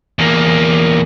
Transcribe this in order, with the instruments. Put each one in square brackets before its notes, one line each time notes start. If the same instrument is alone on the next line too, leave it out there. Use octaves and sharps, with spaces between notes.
[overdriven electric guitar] E2 A#3